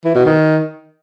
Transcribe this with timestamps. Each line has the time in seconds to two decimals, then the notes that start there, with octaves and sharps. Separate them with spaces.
0.05 E3
0.15 B2
0.25 D#3